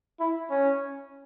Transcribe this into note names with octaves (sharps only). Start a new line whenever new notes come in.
E4
C#4